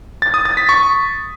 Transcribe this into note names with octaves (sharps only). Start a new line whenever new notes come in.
A6
D#6
A6
B6
C#6